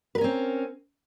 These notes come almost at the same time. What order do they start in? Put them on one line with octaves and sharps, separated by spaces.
B4 A#4 C#4 C4